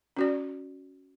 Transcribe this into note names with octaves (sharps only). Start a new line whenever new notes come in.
C#4 F#4 D5